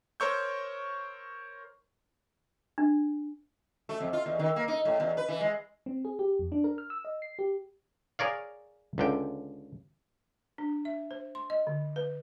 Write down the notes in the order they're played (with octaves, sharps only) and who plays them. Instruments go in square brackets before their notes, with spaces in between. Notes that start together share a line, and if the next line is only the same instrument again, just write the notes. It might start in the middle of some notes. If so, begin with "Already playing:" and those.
[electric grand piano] A#4 C5 C#5 C#6 E6 G6
[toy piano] D4
[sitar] A3
F2
F4
E2
D#3
A#3
D#4
A2
E2
B4
E3
G#3
[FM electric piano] C4
G#4
G4
F2
D4
A#4
F6
E6
D#5
C7
G4
[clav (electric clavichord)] G#4 A#4 C#5 D5 F5
C#2 D3 G5
[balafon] D4
E5
C5
C6
D#5
D3
B4